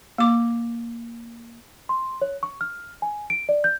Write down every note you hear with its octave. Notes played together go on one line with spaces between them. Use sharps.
A#3 D6
C6
C#5
C#6
F6
G#5
D7
D5
G6